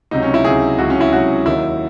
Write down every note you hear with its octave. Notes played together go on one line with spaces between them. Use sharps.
C#2 C3 F#3 D#4
C#4
E4
C#2 C3 F#3 G#4
C#2 C3 F#3 F#4
C#4
E4
C#2 C3 F#3 F#4
D#2 D#3 F#3 E4